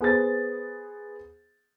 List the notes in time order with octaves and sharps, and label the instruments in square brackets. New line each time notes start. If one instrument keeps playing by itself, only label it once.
[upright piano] B3 G#4 C5 A6